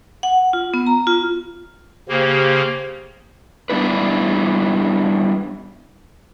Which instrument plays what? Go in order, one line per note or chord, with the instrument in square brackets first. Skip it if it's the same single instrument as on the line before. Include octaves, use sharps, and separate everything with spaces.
[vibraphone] F#5
F4
B3
A#5
F4
[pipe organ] C#3 A#3 [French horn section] G4 C5
[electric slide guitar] G3 B3 D4 E4 B4